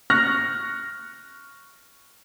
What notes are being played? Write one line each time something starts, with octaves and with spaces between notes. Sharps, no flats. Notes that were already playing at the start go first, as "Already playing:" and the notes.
C#6 F6 F#6 A#6